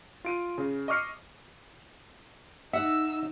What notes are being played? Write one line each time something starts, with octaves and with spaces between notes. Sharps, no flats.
F4 D7 D#7
C#3
D#5 C#6 D6 F6 C7 C#7
D#4 E5 F#5 E6